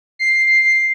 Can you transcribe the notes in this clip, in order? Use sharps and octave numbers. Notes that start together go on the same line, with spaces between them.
C7